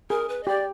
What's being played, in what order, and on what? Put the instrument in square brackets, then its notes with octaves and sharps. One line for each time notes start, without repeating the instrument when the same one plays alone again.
[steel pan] G#4 [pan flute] A#4
[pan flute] B4
D#5
[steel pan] G4 [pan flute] D5